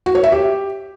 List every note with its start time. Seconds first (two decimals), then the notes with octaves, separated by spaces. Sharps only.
0.06 F#4
0.15 C#5
0.23 E5
0.32 G4